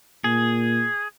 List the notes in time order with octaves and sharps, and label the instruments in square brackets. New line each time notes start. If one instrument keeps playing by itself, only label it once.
[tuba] A#2 [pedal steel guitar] G#4